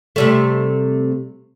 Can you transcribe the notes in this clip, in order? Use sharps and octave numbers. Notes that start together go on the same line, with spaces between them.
C3 G3 A3